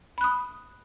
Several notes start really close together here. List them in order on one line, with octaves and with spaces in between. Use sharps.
B5 F#6 D#6